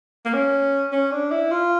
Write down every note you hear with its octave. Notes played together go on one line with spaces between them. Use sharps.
A#3
C#4
C#4
D4
E4
F4